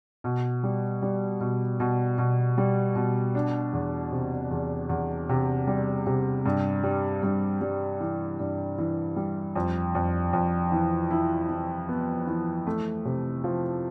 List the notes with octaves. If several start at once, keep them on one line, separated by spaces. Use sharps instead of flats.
B2
G3
G3
B2
B2
B2
G3
B2
D4
E2
C3
E2
E2
C3
G3
C3
G2
G3
G2
G3
E3
G2
E3
G3
F2
F2
F2
E3
E4
E3
B3
E3
A3
C3
F3